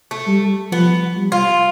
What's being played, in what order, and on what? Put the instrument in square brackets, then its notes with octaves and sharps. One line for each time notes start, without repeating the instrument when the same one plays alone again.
[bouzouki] A3
[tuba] G3
[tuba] F3 [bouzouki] B3
[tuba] G3
[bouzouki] F4